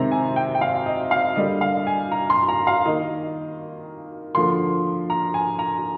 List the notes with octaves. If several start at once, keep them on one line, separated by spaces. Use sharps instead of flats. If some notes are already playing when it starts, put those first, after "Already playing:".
Already playing: C3 D#3 G#3 C4 A#5
G#5
G5
G5
F5
D#5
F5
D3 G3 A#3 D#5
F5
G#5
A#5
C6
A#5
F5
D#3 A#3 D#5
D3 F3 A#3 C6
A#5
G#5
A#5